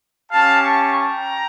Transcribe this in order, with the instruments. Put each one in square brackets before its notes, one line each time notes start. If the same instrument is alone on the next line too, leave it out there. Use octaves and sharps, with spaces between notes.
[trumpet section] C#4 G4 F5 A5
A5 C#6
G5 A#5